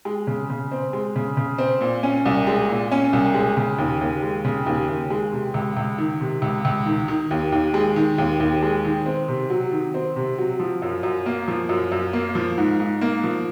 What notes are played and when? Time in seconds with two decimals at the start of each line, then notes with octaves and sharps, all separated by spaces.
0.05 G#3
0.27 C#3
0.50 C#3
0.72 C4
0.93 G#3
1.16 C#3
1.37 C#3
1.58 C4
1.81 A#2
2.03 C#4
2.25 C2
2.47 G#3
2.69 A#2
2.91 C#4
3.13 C2
3.34 G#3
3.57 C#3
3.78 D#2
4.01 D#2
4.22 G#3
4.45 C#3
4.66 D#2
4.89 D#2
5.10 G#3
5.33 C3
5.54 C#2
5.77 C#2
5.98 D#3
6.21 C3
6.42 C#2
6.65 C#2
6.86 D#3
7.08 D#3
7.31 D#2
7.52 D#2
7.74 G#3
7.96 D#3
8.18 D#2
8.40 D#2
8.63 G#3
8.84 D#3
9.06 C4
9.28 C3
9.50 F#3
9.71 D#3
9.94 C4
10.16 C3
10.38 F#3
10.60 F3
10.82 F#2
11.03 F#2
11.26 A#3
11.48 F3
11.69 F#2
11.92 F#2
12.13 A#3
12.35 F3
12.57 G#2
12.80 G#2
13.01 A#3
13.24 F3